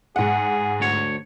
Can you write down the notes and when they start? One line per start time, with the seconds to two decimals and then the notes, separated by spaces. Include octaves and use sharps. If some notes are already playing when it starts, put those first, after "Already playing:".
0.16 G#2 G#4 F#5
0.80 D2 C#5